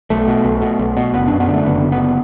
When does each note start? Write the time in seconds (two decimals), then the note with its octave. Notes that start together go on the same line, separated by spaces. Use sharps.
0.10 B1 A3
0.28 B2
0.45 B1
0.62 B2
0.79 B1
0.97 B2
1.14 F#1 B3
1.28 F#2 D4
1.40 B3
1.48 D3
1.54 A3
1.66 F#1 B3
1.83 F#1
1.92 B3